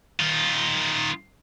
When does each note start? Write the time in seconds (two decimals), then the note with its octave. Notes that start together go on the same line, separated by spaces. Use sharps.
0.19 D#3 F4